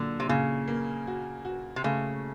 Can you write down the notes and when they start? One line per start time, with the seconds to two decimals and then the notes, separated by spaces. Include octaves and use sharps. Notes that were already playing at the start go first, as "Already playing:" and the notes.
Already playing: A#2 D3 F#3
0.20 C3
0.29 A#2 C#3
0.68 A#3
1.07 F#4
1.45 F#4
1.76 C3
1.84 C#3 A3